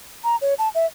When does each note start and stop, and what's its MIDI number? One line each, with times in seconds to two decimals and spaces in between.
0.24 0.36 82
0.41 0.54 73
0.59 0.69 81
0.75 0.86 76